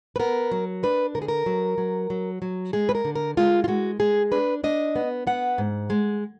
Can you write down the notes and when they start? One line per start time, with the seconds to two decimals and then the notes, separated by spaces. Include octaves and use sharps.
0.16 B4
0.19 B3 A#4
0.51 F#3
0.83 D4 B4
1.15 D3 A#4
1.22 G#4
1.28 A#4
1.46 F#3
1.78 F#3
2.10 F#3
2.42 F#3
2.73 G#3 G#4
2.89 B4
2.95 A#4
3.05 D3
3.15 A#4
3.37 G#3 F4
3.64 F4
3.68 G#3 F#4
4.00 G#3 G#4
4.32 D4 B4
4.64 D4 D#5
4.96 B3
5.27 B3 F#5
5.58 G#2
5.90 G#3